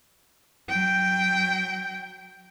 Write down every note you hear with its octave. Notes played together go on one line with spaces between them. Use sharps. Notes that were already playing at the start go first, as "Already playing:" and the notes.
F#3 G5